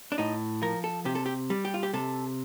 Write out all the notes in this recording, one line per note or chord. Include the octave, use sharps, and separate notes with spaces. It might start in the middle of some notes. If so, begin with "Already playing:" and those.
D4
A2 D#4
F3 A#4
A4
C3 G4
A4
G4
G3
G4
F4
G4
C3 A4